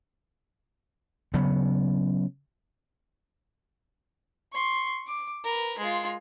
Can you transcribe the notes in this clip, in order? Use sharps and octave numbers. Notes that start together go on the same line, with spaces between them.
C#3 F#3 B3
C6 C#6
D6
A#4 B4
G#3 F4